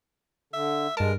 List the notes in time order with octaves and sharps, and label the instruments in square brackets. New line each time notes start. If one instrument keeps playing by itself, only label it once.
[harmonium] D3 [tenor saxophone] E5
[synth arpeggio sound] G2 A5 [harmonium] G#3 [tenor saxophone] A#4